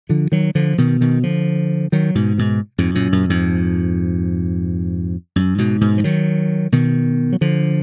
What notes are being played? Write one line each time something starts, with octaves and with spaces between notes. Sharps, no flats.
D3 F3
D#3 F#3
D3 F3
B2 D#3
B2 D#3
D3 F3
D#3 F#3
G#2 B2
G#2 B2
F2 G#2
F#2 A#2
F#2 A#2
F2 G#2
F#2
G#2 B2
G#2 B2
F3
D#3 F#3
B2 D#3
F#3
D3 F3